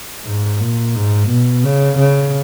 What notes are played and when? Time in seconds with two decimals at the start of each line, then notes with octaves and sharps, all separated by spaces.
0.25 G#2
0.60 A#2
0.95 G#2
1.29 B2
1.64 C#3
1.98 C#3